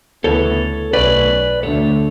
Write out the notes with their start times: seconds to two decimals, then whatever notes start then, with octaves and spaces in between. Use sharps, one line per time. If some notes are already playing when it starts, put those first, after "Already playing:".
0.24 D2 C#3 E3 B3 A4 C#5
0.93 B1 B2 A3 C#4 B4 D5
1.63 D2 D3 A3 A4 C#5